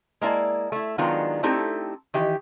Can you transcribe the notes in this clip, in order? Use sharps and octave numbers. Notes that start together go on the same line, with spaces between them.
G#3 A#3 E4 D5 A5
A3 E4
D#3 F#3 G#3 B3 D4 F4
A3 C4 D#4 E4 G4 A4
D#3 E3 G4